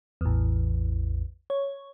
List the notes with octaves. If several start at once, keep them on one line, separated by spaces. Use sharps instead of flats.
A1 E2
C#5